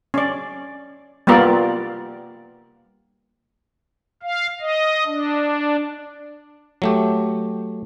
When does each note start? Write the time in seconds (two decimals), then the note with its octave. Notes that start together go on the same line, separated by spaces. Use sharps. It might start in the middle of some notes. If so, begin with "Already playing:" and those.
0.14 C#4 D5
1.27 G3 A#3 B3 F4 A#4 D5
4.23 F5
4.60 D#5
5.06 D4
6.82 F#3 A3 G4